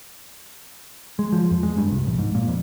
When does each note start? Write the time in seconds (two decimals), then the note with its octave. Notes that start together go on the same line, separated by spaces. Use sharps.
1.19 G#3
1.33 F3
1.51 F2
1.63 G#3
1.78 G2
1.91 C2
2.07 A#1
2.19 G#2
2.35 A#2
2.48 F2